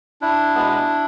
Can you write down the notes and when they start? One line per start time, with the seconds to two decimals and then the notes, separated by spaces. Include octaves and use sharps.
0.21 D4 E4
0.55 B2 G#3 B3